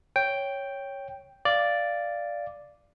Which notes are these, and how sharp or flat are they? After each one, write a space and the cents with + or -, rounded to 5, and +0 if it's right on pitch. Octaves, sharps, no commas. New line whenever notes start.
C#5 +0 G5 +0
D5 +0 F5 -10